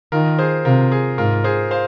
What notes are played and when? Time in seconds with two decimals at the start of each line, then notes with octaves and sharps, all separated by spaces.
0.12 D#3 F4 A#4
0.39 G#4 C5
0.65 C3 F4 A#4
0.92 G#4
1.18 G#2 F4 A#4
1.44 G#4 C5
1.71 C5 F5